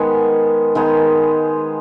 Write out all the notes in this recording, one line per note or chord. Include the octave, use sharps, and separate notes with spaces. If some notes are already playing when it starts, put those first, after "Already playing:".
Already playing: D#3 G#3 B3 F#5 G#5
D#3 G#3 B3